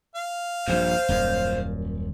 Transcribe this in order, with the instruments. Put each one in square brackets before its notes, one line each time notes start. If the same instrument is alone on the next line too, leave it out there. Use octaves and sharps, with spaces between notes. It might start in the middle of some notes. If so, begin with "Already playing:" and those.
[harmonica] F5
[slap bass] A#1 G2 [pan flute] C5
[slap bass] D#1 F#2